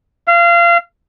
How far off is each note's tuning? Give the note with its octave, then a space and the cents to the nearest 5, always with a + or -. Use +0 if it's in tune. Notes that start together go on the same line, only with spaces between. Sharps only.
F5 -25